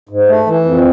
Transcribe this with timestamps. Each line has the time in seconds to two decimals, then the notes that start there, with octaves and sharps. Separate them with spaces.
0.09 G#2
0.28 A3
0.46 E3
0.65 F2